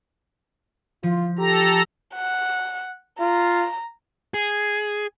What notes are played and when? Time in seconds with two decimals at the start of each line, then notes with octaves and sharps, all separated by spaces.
1.03 F3 F4
1.38 G4 A4 A#5
2.16 F#5
3.20 F4 A#5
4.34 G#4